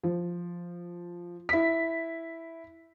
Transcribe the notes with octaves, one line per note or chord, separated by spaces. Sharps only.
F3
E4 B6